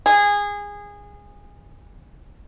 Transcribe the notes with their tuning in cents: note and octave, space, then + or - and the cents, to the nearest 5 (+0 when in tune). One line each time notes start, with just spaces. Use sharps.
G#4 -20